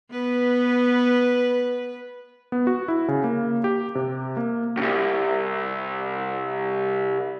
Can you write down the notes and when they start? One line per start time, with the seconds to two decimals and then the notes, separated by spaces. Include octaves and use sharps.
0.13 B3 B4
2.52 B3
2.67 F#4
2.88 E4
3.08 C#3
3.24 A#3
3.64 G4
3.95 C3
4.37 A#3
4.77 C2 F#2